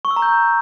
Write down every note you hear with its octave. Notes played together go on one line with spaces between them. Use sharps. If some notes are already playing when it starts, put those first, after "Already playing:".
C#6
E6
A#5
G6